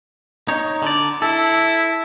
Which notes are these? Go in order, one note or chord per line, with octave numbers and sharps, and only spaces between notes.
D#4 C#5
D3 D5
E4 A4